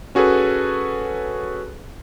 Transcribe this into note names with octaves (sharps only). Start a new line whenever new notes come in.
C#4 F#4 G#4 A4 B4